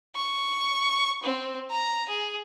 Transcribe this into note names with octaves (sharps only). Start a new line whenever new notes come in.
C#6
C4
A#5
G#4